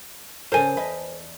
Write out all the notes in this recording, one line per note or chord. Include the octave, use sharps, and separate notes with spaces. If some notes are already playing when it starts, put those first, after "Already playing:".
C#3 A4 A#4 C5 G#5
E2 B4 D#5